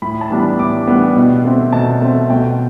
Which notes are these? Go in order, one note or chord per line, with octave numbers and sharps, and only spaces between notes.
A2 B5
A5
E3 G3 B3 D4
B5
A2 D6
E3 G3 B3 D4
B2
A3 C4
B2 A5
A3 C4
B2 G5